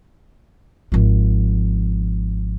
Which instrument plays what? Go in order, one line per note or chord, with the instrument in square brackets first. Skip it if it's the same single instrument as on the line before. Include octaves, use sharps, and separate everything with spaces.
[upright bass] G#1 F3